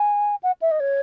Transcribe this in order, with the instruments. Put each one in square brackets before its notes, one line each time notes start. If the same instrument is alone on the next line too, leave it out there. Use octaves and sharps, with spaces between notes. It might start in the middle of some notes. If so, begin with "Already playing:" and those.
Already playing: [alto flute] G#5
F#5
E5
D#5
C#5